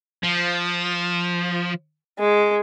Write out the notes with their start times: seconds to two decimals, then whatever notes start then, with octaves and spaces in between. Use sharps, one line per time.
0.24 F3
2.19 G#3